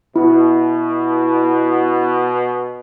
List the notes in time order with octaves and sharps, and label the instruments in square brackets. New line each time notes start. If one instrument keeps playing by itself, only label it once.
[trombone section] B2 [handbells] E4